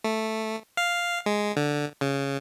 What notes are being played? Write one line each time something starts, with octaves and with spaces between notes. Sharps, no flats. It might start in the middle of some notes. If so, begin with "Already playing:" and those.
A3
F5
G#3
D3
C#3